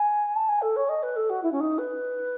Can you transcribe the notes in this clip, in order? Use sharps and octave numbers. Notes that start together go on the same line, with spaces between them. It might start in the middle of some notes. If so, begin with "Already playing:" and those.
Already playing: G#5
A5
G#5
A4
C#5
D#5
B4
A4
F#4
E4
C#4
D#4
B4